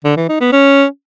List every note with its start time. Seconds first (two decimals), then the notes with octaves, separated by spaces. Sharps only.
0.05 D3
0.17 E3
0.29 D#4
0.41 B3
0.53 C#4